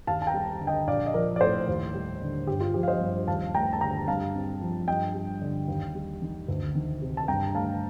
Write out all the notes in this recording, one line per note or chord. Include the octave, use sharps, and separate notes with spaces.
D#2 F5 A5
A5
G5 A#5
G3
D3
D#5 G5
A#1 D5 F5
D#5
F3 A#4 D5
D5
A2 A4 C5
D#2
G3
D3
G1 G4
F4
F3 G4
F5
C5 D#5
G2
D#2 F5 A5
A3 G5 A#5
A5
D3 G5 A#5
G2 F5 A5
C4
F3
G2 D#5 G5
G3
D3
D#2
G3
D#3
D2
D#3
C3
A5
G2 G5 A#5
A3 F5 A5